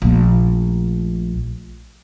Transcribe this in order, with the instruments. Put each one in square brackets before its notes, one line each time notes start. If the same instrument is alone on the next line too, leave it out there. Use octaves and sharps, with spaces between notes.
[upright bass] A#1 A3